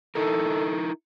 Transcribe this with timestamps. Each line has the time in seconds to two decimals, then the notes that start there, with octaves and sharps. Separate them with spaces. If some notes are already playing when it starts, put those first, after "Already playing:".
0.15 D#4 E4 A4 A#4